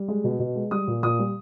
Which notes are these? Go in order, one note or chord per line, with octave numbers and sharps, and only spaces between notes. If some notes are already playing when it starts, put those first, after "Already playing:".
Already playing: G3
G#3
B2
B2
G#3
G3 D#6
A#2
A#2 D#6
G3